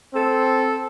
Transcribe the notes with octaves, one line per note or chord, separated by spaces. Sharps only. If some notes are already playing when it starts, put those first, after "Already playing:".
C4 A4